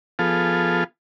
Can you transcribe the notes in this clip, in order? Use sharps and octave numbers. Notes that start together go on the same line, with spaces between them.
F3 B3 F4 G#4 A4 F5